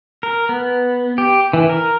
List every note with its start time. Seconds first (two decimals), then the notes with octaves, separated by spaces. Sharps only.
0.23 A#4
0.49 B3
1.18 G4
1.53 E3
1.69 A#4